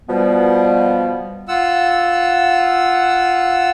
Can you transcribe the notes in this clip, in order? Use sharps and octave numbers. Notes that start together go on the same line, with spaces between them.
B2 F3 G3 B3
F4 F#5 E6